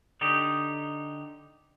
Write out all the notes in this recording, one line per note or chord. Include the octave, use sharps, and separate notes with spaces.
D3 D#4 G4